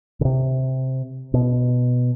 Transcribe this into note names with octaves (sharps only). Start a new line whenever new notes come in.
C#3
C3
B2